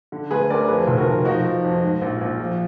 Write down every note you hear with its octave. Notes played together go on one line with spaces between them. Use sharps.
D3
D2 G#4 B4
D2 A#4 D5
F2 G#4 B4
F1
F#4 A#4
F1
F3 D#4 F#4
F3
F2
G#2
A#1
A#1
F3